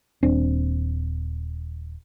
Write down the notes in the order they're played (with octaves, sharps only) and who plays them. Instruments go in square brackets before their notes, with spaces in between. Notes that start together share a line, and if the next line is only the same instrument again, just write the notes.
[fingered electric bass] D#1 C4 D4